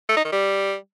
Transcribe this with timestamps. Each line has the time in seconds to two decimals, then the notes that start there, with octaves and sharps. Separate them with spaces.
0.09 A3
0.17 D#4
0.24 D#3
0.32 G3